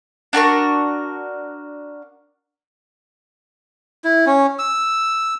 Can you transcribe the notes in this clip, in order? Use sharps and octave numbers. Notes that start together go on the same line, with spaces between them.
D4 F#4 A#4 C#6
E4
C#4
E6